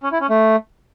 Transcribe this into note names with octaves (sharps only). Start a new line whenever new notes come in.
C#4
E4
C#4
A3